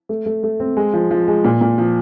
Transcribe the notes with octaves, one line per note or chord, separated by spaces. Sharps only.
A3
A3
A3
C4
G#3
F3
F3
G#3
A#2
A#2
F3